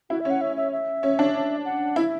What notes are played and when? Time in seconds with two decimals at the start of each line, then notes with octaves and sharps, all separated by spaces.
0.10 E4 F#4
0.20 E5
0.25 C#4 F#5
0.41 E5
0.57 E5
0.72 E5
1.03 C#4
1.19 D4
1.65 F#5
1.96 E4 E5